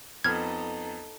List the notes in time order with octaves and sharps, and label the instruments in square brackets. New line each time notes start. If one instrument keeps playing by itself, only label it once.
[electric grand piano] F2 B3 [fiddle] D#4 A4 [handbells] F6 G#6